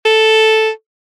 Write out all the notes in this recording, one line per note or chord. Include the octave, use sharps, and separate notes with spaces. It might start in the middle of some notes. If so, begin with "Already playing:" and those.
A4